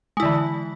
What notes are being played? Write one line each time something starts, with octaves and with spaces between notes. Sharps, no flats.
D3 E3 G#3 E4